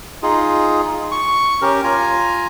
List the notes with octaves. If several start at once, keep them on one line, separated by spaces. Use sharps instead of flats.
D#4 F4 G#4
C#6
C#4 G4 A#4
F4 G#5 A#5